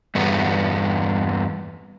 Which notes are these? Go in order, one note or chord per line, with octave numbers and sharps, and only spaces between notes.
E2 G2 B3